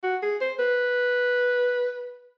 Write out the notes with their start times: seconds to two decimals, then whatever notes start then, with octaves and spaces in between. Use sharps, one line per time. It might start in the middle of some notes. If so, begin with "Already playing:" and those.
0.03 F#4
0.23 G#4
0.41 C5
0.59 B4